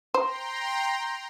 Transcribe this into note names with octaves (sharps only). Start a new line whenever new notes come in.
C5 G5 A#5 C6